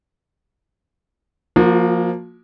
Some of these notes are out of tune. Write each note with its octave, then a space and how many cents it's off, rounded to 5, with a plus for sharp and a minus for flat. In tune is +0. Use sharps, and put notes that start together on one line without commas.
F3 +0 A#3 +0 F#4 -40